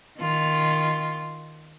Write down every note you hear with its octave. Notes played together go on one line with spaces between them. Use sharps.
D#3 F4